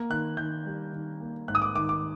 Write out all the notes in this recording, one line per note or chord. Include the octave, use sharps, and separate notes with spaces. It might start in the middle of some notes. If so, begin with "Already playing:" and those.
Already playing: A#3
D#3 F#6
D#3 G6
G3
D#3
A#3
G#2 F#6
D#6
D6
D#3 D6
D6